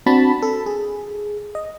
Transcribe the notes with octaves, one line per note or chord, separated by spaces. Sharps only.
C4 D4 F#4 A5 B5
A4
G#4
D#5